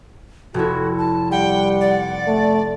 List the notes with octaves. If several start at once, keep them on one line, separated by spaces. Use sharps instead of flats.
F1 E4 F#4
A5
G3 F#5 G5
D5
A3